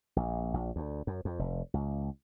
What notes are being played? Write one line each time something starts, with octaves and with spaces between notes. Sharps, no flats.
A#1
A#1
D2
F#2
F2
F1
C#2